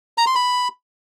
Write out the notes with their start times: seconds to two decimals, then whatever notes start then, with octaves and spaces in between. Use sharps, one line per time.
0.18 A#5
0.27 C6
0.35 B5